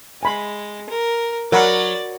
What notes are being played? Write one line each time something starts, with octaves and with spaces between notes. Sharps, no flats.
G#3 G#5 B5 C6
A#4
F#3 A#4 D5 F#5 B5